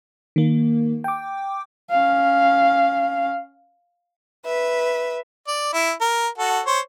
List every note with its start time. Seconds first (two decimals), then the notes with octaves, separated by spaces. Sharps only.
0.36 D#3 A#3
1.04 G5 D6
1.90 C#4 F5
4.45 B4 E5
5.47 D5
5.73 E4
6.01 A#4
6.38 F#4 A4
6.66 C5 C#5